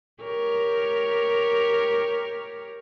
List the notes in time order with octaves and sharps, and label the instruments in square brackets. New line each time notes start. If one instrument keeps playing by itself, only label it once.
[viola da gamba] G4 A#4 C#5